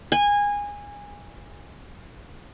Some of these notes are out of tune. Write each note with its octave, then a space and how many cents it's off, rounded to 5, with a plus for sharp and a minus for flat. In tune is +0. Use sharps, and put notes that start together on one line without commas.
G#5 -20